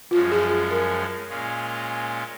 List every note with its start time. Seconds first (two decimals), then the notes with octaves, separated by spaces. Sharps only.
0.11 F#2 F3 G#3 C#4 F4
0.31 G#4
0.71 A#4
1.29 A#2 G#3 C#4 F4